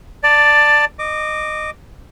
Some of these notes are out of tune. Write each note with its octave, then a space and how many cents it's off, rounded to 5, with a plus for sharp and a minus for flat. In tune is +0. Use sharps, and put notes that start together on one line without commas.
D5 +5 A5 +15
D#5 -20 D6 +0